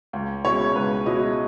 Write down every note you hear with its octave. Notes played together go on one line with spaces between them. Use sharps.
C#2
B2 G#3 C#4 E4 C#5
C#2 B4
B2 G#3 C#4 E4 D#5